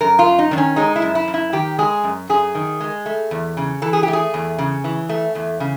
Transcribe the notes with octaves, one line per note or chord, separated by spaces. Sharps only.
F#2 A#4
F4
F#2
D#4
D#3 D4
C#4
G#3 D#4
E4
F#2
E4
F#2
E4
D#3 G4
G#3 G#4
F#2
F#2 G#4
D#3
G#3
A3
E2
C#3
E3 A4
G#4
G4
A3
G#4
E2
C#3
E3
A3
E2
C#3